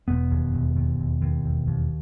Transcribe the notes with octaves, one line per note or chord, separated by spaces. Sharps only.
E1 B3
D#2
E1
D#2
E1
D#2
E1
D#2